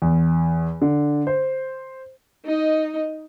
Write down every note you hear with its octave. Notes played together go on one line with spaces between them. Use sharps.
E2
D3
C5
D#4 D#5